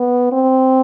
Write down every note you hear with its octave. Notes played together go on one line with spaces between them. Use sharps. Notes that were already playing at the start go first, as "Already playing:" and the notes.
Already playing: B3
C4